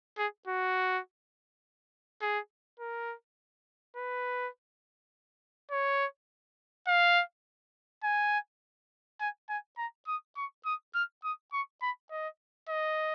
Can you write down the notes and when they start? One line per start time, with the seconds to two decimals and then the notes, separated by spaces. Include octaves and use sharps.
0.18 G#4
0.47 F#4
2.22 G#4
2.80 A#4
3.96 B4
5.71 C#5
6.87 F5
8.04 G#5
9.20 G#5
9.49 G#5
9.78 A#5
10.07 D#6
10.37 C#6
10.65 D#6
10.95 F6
11.24 D#6
11.53 C#6
11.82 B5
12.11 D#5
12.69 D#5